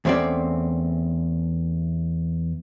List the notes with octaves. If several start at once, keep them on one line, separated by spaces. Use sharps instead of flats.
E2 A3 C4 C#4 D5